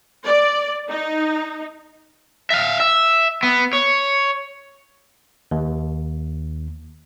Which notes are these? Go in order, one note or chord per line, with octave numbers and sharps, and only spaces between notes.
D5
D#4
E5 F5
E5
B3
C#5
D#2